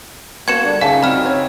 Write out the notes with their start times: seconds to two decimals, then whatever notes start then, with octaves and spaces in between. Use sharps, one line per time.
0.48 A#3 B3 F#4 G#6 C#7 E7
0.63 D3 G3 D4
0.81 C#2 D#4 G#4 E5 F5 G#5 A5
1.03 C4 F#4 B5 F6
1.24 E3 C#5